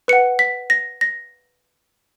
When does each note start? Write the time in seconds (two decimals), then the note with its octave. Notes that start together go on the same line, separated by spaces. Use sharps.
0.08 B4 F#5 C#7
0.39 B6
0.70 A#6
1.01 A#6